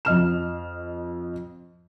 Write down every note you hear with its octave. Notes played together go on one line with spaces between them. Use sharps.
F2 D#5 F6 E7